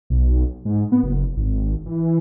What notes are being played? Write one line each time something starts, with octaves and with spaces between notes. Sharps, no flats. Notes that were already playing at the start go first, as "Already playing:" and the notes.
B1
G#2
B3
F#1
G#1
E3